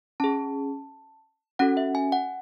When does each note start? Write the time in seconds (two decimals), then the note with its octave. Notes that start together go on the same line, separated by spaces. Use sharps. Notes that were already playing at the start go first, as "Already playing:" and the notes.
0.20 C#4 G#4 A5
1.59 C#4 F#4 A4 F#5
1.77 E5
1.95 G#5
2.12 F#5